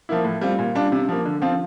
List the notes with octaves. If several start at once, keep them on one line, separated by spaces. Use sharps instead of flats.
F3 A#3 E4
A2
G3 C4 F4
A#2
G3 D4 F4
C3
F3 A#3
D3
F3 C4 F4